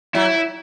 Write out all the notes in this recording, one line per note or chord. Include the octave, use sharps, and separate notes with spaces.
F#3 E4